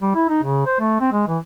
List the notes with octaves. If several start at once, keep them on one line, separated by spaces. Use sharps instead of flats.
G3
E4
D#4
C#3
C5
A3
C4
G#3
E3